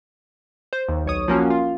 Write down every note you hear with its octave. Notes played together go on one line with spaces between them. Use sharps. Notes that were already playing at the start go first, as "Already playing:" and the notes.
C5
D#2
B1 C#5 D#6
F3 A#3 C#4 F#4
F4